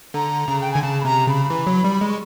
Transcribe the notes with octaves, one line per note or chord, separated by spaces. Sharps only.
D3 A#5
C#3
G5
D3 G#5
C#3 A5
B5
C3 A#5
C#3 B5
E3
F#3
G3
G#3
C#6